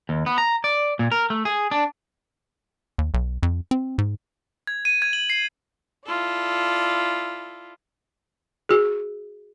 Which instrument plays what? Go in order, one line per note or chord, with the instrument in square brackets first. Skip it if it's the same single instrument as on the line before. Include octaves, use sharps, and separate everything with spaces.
[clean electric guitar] D#2
B3
A#5
D5
A#2
A#4
A3
G#4
D4
[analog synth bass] D#2
B1
F2
C4
G#2
[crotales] G#6
D#7
G#6
F#7
C7
[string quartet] E4 F4 A4 D5
[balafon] F#4 G#4